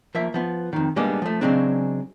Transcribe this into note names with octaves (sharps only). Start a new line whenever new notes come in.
F3 A#3 E5
F3 B3
F2 D#3
G3 G#3 A#3 B3 D4
F3 A3
C#3 F#3 G#3 C4 D4